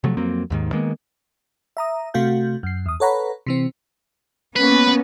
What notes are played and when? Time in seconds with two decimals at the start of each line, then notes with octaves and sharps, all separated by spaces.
0.04 C3 F3 F#3 A3
0.17 F2 F#3 A#3 C4
0.50 D#2 G#2 D#3
0.72 D#3 G#3 A#3 B3
1.77 E5 A#5 D#6
2.14 C3 A3 F#4 F5 G6
2.63 F#2 C7
2.86 E2 D#6
3.00 A4 B4 C#5 F#5 A#5 B5
3.46 C3 E3 C4
4.56 A#3 B3 C#4 B4